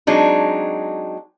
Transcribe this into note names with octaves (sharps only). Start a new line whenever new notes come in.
F#3 G#3 C4 D4 D#4